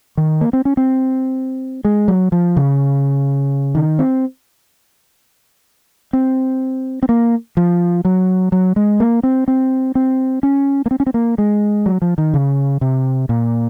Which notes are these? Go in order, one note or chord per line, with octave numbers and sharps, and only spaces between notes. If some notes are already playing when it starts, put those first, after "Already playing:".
D#3
A#3
C4
C#4
C4
G#3
F#3
F3
C#3
D#3
C4
C4
C4
A#3
F3
F#3
F#3
G#3
A#3
C4
C4
C4
C#4
A#3
C4
C#4
C4
A#3
G#3
F#3
F3
D#3
C#3
C3
A#2